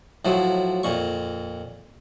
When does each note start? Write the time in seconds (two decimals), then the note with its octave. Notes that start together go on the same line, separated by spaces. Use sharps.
0.25 A2 F3 F#3
0.83 F2 A#2 C#6